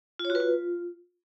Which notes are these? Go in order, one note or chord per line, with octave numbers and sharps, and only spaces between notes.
F4
C#5
F#4
B4
F4